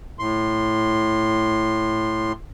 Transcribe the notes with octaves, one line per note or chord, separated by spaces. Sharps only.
A2 C6